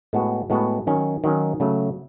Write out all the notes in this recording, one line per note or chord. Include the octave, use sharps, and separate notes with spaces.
A2 G#3 B3 F#4
A2 G#3 B3 F#4
D#3 F#3 C#4
D#3 F#3 C#4
C#3 F#3 A3